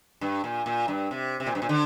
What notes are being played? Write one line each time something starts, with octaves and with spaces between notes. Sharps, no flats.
G2
A#2
A#2
G2
C3
C3
A#2
G2
A#2
D3